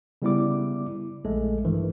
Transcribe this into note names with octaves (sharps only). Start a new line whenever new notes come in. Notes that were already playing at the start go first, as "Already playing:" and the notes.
C#3 G3 B3 E4 D5 D6
A#1 G#3 A3 A4
G2 D#3 E3